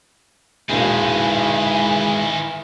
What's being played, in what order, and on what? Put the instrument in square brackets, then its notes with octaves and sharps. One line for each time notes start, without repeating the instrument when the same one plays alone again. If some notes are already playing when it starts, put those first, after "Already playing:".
[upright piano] E1 A#1 [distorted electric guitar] D#3 C4 [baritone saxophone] E3 [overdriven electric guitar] G#3